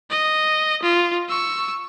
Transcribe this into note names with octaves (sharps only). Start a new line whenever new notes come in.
D#5
F4
C#6 E6